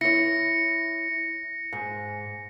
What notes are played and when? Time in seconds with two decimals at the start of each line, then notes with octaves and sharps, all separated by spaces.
0.01 E4 C#5 A#6 C#7
1.73 G#2